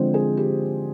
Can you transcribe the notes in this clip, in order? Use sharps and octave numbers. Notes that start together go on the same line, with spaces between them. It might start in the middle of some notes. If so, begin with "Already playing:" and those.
Already playing: D3 F3 G#3 C4 C5
G#4
G4